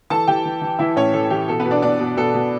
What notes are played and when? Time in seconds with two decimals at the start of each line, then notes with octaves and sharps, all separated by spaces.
0.10 E3 A4 A5
0.27 E3 G4 G5
0.45 E3
0.61 E3
0.79 E3 E4 E5
0.96 A2 C#4 C#5
1.13 E3 A4
1.30 E3 G4
1.48 B2 A4
1.60 B3 B4
1.65 B2
1.71 D4 D5
1.82 B2 D4 D5
2.00 B2
2.17 B2 A4
2.34 B2